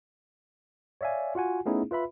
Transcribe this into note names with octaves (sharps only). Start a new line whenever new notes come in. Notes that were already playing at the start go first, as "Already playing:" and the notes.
C#5 D5 E5 F5 G#5
F4 F#4 F#5 G#5
A3 B3 C#4 D#4 E4 G#4
F4 B4 E5 B5